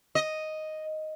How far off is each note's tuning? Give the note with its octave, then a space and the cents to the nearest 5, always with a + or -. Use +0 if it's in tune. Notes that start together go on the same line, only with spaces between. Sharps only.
D#5 +0